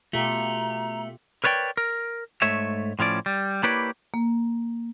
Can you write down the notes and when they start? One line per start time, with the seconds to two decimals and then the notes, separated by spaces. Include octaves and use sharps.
0.13 B2 A3 F4 G4 A#5
1.44 A#4 B4 C#5 D5 G5
1.77 A#4
2.42 G#2 A3 C#5 E5
2.99 A2 F3 C#4 D5
3.26 G3
3.63 A#3 E4 G4 B4 C#5 D5
4.14 A#3